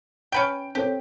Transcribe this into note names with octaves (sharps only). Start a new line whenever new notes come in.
C#4 B4 G5 D7
C4 G4 A4 C#5